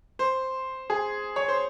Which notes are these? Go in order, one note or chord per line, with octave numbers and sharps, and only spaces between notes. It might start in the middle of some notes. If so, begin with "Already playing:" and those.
C5
G#4
C#5
C5